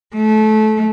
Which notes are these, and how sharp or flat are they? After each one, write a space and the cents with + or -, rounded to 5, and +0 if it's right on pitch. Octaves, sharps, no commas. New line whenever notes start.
A3 -25